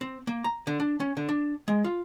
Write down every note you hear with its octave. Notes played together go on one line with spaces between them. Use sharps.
C4
A#3
A#5
D3
D4
C#4
D3
D4
G#3
F4